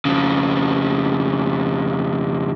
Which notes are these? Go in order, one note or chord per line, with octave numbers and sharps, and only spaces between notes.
F2 C#3